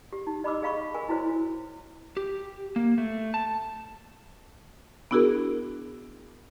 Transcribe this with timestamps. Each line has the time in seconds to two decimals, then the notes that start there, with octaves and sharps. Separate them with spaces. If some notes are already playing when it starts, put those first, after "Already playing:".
0.13 G4
0.27 D#4
0.44 D#5 B5 D6 E6
0.62 G#4 D#5 F5 B5 C#6
0.94 A#4 G#5
1.09 E4 F#4 C5 C#5
2.17 G4
2.76 A#3
2.98 A3
3.34 A5
5.11 B3 D4 E4 F#4 G#4 A#4